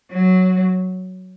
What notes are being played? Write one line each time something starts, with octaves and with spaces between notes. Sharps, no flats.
F#3